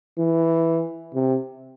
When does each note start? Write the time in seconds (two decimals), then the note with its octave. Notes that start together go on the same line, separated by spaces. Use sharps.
0.18 E3
1.14 C3